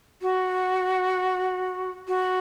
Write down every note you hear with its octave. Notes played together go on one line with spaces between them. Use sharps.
F#4
F#4